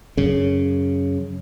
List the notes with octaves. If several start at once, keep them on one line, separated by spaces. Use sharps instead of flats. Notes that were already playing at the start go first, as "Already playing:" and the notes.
F#2 C#3